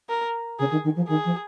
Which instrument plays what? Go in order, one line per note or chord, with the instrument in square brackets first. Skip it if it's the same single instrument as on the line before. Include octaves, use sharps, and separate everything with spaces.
[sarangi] A#4
[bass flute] C#3 [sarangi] G#4
[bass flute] D#3
D#3
F3
[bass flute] D#3 [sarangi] G#4
[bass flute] F3